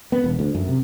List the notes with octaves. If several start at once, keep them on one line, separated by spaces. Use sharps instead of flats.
B3
E1
D2
F#2
C3